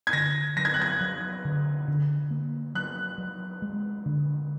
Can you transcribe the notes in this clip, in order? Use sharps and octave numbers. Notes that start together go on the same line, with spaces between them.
G#6
D3 A#6
F#3 A#6
G#6
F#6
G#6
F#3
D3
D3
A#3
F#3 F#6
F#3
G#3
D3